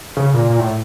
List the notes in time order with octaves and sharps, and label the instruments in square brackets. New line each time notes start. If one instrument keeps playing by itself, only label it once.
[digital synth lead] C#3
A#2
A#2
A2